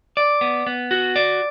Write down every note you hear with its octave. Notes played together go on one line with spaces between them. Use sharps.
D5
B3
B3
F#4
D5